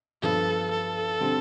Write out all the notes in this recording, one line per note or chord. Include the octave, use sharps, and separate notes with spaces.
G2 F3 B3 A4
A4
D3 G3 C4